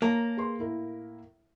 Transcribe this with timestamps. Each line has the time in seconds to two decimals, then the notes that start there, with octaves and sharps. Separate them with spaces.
0.02 A#3 C#5 A5 A#5
0.37 G#4 B4 C6
0.59 A2 E4 A#4